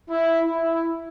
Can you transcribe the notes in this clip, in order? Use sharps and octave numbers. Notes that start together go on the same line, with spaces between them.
E4
E4